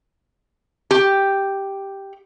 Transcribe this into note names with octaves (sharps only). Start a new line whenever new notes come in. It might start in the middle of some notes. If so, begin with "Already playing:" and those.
G4